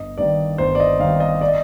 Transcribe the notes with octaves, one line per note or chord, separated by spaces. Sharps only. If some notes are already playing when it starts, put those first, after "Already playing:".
Already playing: G1 D#5
G2 D#3 D5
G1 C5
D5
D#5
G2 D#3 F5
D#5
D5
D#5